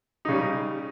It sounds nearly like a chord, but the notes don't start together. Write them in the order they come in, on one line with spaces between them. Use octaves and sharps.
D#4 C#3 G3